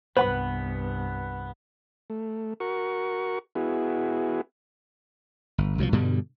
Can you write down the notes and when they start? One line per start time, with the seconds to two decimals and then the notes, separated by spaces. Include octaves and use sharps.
0.17 C2 G2 B3 B4 C5 F#5 B5
2.10 A3
2.60 F#4 A#4 C#6
3.55 B3 E4 F#4 G#4
5.58 G1
5.78 C2 B2 D#3 F3
5.92 G2 B2 D3 G3